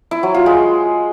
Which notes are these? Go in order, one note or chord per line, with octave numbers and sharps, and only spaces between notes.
E4
F#3
F4
G#3